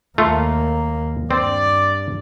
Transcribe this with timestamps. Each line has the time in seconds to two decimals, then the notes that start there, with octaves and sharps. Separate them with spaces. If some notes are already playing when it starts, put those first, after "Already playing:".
0.18 D#2 A3 A#3 F4
1.31 G2 C4 D5